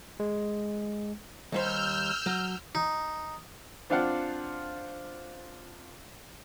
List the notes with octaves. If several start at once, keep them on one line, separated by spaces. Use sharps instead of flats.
G#3
D#2 G3 C5 E6 F6 G6
F#3
D#4
C4 D4 F4 D5 F5 F#5